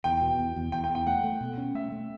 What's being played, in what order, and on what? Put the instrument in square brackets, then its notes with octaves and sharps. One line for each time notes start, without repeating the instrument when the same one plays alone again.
[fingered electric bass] E2 [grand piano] G5
[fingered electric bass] B2
E2
E2
[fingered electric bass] E2 [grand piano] G5
[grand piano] G5
[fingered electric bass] E2
[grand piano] G5
[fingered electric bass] A3 [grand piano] F#5
[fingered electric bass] A3
B2
C#4
[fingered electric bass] A3 [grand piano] E5
[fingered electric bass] A3